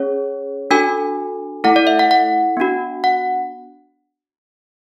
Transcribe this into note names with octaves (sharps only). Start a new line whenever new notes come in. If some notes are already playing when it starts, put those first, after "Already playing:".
Already playing: C#4 G#4 C#5
D4 F#4 A4 G#5
A3 E4 A4 F#5
D5
E5
F#5
F#5
B3 D4 F#4
F#5